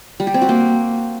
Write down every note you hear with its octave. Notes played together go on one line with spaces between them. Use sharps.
G3
G4
C4
F#4
A#3